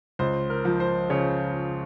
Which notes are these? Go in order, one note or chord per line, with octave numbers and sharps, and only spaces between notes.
C#2 C5
A#4
F3
C5
C#3 C#5